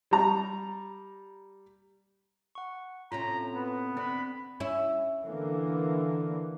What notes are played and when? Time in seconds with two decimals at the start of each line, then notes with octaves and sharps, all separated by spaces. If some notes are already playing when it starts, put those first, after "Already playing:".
0.11 G3 A#5
2.55 F#5 C#6
3.12 A2 C3 C#4 F4 A#5
3.54 B3 B4
3.97 D3 C4 B5
4.60 C#4 E4
5.24 D3 E3 A#3